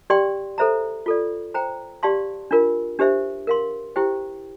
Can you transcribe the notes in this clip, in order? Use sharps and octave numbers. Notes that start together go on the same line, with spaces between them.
G4 D5 G5 C6
A4 C5 E5 A#5
F4 A4 D5
C5 G5 A#5
G4 D5 F5 A5 C6
D4 F4 A#4
D4 G4 C5 E5
A#4 F5 C6
E4 G4 C5 G5